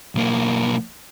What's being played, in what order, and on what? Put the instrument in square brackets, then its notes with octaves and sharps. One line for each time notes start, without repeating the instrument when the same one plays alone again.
[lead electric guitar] B1 A#3